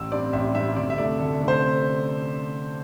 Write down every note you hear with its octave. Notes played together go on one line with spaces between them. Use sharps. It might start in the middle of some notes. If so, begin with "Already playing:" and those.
Already playing: A1 E6
G2 G3 C4 D5
A1 E5
G2 G3 C4 E5
D2 D5
E5
C3 A3 D4 D5
D2 A4
C3 A3 D4
C5